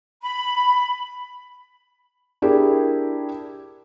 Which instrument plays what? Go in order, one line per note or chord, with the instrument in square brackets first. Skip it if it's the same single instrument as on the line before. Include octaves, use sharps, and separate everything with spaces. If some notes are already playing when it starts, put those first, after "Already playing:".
[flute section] B5
[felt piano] D4 E4 G4 G#4 A#4